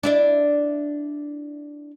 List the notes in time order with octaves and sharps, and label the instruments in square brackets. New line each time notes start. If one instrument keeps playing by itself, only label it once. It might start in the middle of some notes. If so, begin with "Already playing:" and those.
[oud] D4 E4 D5